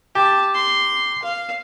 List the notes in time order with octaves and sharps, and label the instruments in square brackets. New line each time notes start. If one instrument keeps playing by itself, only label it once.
[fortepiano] G4 [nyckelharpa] A5
[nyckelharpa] C6
F5